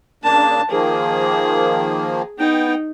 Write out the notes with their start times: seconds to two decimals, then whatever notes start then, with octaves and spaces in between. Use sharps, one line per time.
0.24 C#3 A#3 D4 A5
0.70 D#3 F3 A#3 G#4
2.39 B3 D#4 G5